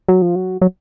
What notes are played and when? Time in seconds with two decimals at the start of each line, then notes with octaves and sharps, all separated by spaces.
0.08 F#3
0.22 F3
0.35 F#3
0.61 F#3